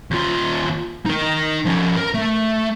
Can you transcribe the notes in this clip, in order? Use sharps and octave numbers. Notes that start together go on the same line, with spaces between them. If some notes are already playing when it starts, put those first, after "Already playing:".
D#2 F4
D#4 A#4
F3 C#4
A#4
A3